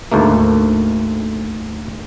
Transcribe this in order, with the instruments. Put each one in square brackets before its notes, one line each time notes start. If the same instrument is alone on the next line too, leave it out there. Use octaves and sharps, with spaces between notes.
[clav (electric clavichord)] D2 G#2 A3 A#3